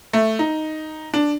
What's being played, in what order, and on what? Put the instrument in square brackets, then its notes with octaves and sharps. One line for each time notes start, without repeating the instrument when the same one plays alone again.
[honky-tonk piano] A3
D#4
D4